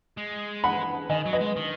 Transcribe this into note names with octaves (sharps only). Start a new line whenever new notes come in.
G#3
F#5 B5
D#3 D#5 G#5
F#3
B4 D#5
G#3
D#3